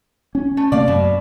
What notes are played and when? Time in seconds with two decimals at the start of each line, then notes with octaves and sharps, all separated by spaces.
0.35 C#4
0.57 A3
0.72 C3 A3 A#3 D5 F5
0.88 F#2 B2